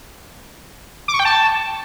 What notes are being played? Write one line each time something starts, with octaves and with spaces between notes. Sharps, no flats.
D6
C#6
G5
A5